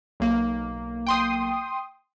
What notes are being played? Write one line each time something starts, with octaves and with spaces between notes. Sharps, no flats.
B1 A#3
G5 C6 D#6